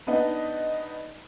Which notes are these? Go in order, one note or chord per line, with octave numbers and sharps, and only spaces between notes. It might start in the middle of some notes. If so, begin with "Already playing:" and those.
B3 D4 D#4 B4 D#5 F#5